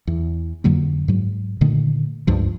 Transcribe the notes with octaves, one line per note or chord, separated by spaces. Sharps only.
E2
F2 D3 F#3 A#3
G#2 F#3
A#2 D3 D#3 A3
C#2 G2 F3